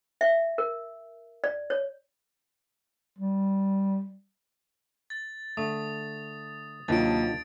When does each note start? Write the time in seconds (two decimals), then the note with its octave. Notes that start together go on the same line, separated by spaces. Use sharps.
0.21 E5
0.58 A#4
1.44 D5
1.70 C#5
3.18 G3
5.10 A6
5.57 D3 A3 D#6
6.88 D#2 C3 D#3 F#3 D4 F4 A6 D7